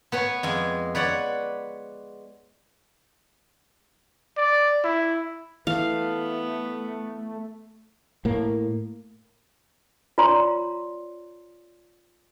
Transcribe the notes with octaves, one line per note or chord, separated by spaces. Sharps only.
B3 B4 C#5
F2 G#3 G#5
B4 C#5 D5 F#5
D5
E4
E3 A3 B3 F5
A2 A#3
F4 C#5 D5 A#5 C6